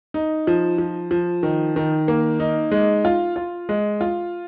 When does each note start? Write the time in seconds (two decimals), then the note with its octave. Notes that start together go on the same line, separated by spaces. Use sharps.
0.14 D#4
0.47 F3
0.78 F3
1.11 F3
1.43 D#3
1.76 D#3
2.08 A#3
2.40 D#4
2.71 G#3
3.05 F4
3.36 F4
3.69 G#3
4.01 F4